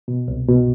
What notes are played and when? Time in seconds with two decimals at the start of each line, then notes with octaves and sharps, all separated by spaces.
0.08 B2
0.28 C2
0.48 B2